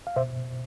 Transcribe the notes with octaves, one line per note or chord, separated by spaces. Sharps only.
F5
B2 C5 E5